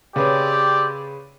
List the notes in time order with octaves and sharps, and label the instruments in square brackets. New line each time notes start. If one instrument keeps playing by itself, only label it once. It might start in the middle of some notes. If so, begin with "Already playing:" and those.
[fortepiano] C#3 B4 C#5 [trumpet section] C4 G4 D5